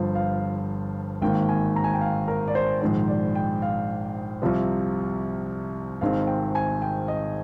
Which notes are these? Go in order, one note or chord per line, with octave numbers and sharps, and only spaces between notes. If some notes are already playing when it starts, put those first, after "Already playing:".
Already playing: G1 G2 F3 C5
F5
G#1 G#2 D#3 A#3 G5
G#5
A#5
G#5
G5
F5
A#4
D5
C5
A#1 G#2 D#3 G#3 C5
D5
G5
F5
C2 C3 F3
G#1 G#2 D#3 G#3 C4 F5
G5
G#5
G5
D#5